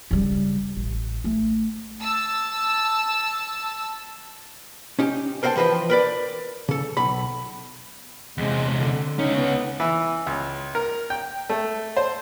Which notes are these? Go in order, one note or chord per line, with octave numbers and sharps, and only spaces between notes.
C#3 G3
A1
A3
A5 E6
C#4 D#4 G4
A#4 C5 D#5 F#5 G5 A5
E3 F3 B4 C5 D#5
A#4 B4 D5
C#3 A4
B1 B5
E2 C3 G#3
D3
C#2 C#4 D#4
B3
E3
C#2
A#4
G5
A3
C5